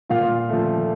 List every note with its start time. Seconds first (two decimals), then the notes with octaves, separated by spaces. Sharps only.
0.10 A#2 F4 F5
0.49 F3 A3